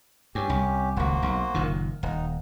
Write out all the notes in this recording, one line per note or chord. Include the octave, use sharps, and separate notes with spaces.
G2 C#4 G4
C2
D#1 C#2 A#3 F#4 C5
B1
F#1 A#2 D#3
D#1 D#4